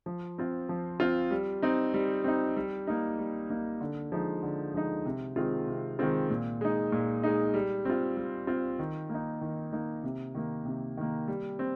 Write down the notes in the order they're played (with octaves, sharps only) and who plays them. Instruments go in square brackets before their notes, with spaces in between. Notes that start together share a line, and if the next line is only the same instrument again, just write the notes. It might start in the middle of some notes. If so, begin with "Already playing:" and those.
[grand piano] F3
C4 F4
F3
C4 F4
G3
C4 D#4
G3
C4 D#4
G3
A#3 D#4
G3
A#3 D#4
D3
F3 G#3 D#4
D3
F3 G#3 D#4
C3
D#3 G#3 C4 F4
C3
D#3 G#3 C4 F4
A#2
G#3 D#4
A#2
G#3 D#4
G3
C4 F4
G3
C4 F4
D#3
A#3 D#4
D#3
A#3 D#4
C3
D#3 A#3
C3
D#3 A#3
G3
C4